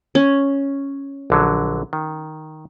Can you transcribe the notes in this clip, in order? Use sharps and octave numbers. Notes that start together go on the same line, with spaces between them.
C#4
A#1 D3 F#3
D#3